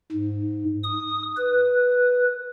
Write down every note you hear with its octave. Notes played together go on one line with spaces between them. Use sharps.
G#2
D#6
B4